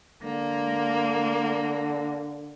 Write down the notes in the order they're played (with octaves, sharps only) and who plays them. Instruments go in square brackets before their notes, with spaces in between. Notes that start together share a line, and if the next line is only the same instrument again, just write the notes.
[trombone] D3 [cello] A#3